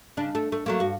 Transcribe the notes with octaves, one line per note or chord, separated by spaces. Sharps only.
C#3 D4
A3
A3
F#3 A3 A#3
G2 F#4